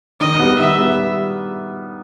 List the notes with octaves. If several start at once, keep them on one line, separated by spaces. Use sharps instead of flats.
D#3 D#5
G3 B3
D#3 E5
G3 B3